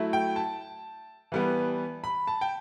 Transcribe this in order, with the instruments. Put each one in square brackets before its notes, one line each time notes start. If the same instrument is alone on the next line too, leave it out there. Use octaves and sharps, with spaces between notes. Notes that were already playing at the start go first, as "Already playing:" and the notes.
Already playing: [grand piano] F#3 A3 E4
G5
A5
E3 G3 B3
B5
A5
G5